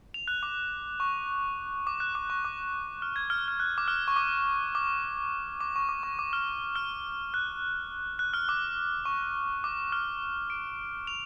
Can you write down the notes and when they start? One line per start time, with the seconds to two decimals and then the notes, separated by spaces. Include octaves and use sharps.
0.14 F7
0.28 F#6
0.43 D6
1.00 C#6
1.87 D6
2.00 F#6
2.15 D6
2.30 C#6
2.45 D6
3.02 F6
3.16 G#6
3.30 F6
3.48 F6
3.60 F#6
3.78 D6
3.88 F6
4.08 C#6
4.16 D6
4.75 D6
5.61 D6
5.76 C#6
5.89 D6
6.03 C#6
6.19 D6
6.33 F6
6.76 F6
7.34 F#6
8.19 F#6
8.34 F6
8.49 D6
9.05 C#6
9.64 D6
9.92 F6
10.50 D7
11.07 F7